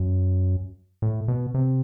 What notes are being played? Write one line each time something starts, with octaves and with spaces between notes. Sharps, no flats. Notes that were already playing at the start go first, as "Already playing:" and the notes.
Already playing: F#2
A2
B2
C3